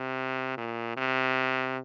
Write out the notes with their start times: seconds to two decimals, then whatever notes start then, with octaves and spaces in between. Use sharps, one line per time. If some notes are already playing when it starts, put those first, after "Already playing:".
Already playing: C3
0.58 A#2
0.97 C3